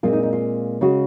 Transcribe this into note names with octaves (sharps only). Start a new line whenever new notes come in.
A#2 G#3 C4 F4
D#4
D#4
F4
C#3 G#3 C#4 F#4